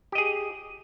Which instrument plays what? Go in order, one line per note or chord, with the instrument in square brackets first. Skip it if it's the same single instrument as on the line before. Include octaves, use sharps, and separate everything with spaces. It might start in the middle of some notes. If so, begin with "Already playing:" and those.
[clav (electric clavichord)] G4
D#5
G#4